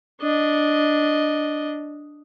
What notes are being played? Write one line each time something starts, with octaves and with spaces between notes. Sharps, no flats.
D4 D#5